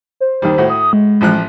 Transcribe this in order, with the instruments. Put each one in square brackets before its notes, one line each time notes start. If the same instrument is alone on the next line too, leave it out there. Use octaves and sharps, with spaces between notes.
[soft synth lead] C5
[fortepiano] D#2 D#3 G3
A2 F#4
[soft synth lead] D#6
G#3
[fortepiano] A1 F3 F#6